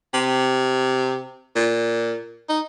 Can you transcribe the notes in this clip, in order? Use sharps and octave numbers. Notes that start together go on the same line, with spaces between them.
C3
A#2
D#4